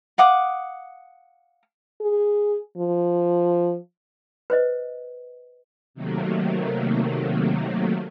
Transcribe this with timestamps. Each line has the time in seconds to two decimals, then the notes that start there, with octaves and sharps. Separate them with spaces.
0.18 F5 F#5 D6 D#6
2.01 G#4
2.77 F3
4.50 B4 C5 D#5
5.94 C3 D#3 F#3 A3 A#3